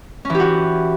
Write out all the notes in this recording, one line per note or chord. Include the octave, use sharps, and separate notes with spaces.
E3 C#4 F#4 G4